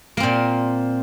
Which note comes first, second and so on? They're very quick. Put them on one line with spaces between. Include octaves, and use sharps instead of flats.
A#3 C4 A#2